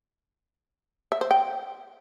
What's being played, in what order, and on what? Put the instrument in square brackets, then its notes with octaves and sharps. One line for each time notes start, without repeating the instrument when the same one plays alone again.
[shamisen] E5
C5
G5